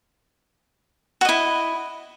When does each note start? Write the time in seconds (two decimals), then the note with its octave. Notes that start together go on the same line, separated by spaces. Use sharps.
1.21 F#4
1.25 D#5
1.29 E4